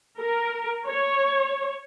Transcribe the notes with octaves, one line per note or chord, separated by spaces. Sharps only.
A#4
C#5